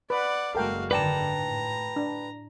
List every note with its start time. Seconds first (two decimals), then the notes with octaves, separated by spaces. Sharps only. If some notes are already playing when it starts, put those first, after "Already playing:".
0.10 B4 D5 F#5
0.55 F#1 G#3 F#4 A4 A#4 F5 G5
0.91 G#2 D3 D#3 B4 D5 G5 A5 A#5
1.37 A2
1.96 D4